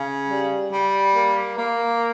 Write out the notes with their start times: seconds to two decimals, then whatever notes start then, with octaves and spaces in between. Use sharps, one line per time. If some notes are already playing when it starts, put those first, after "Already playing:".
Already playing: C#3
0.28 G3
0.71 G3
1.14 A#3
1.57 A#3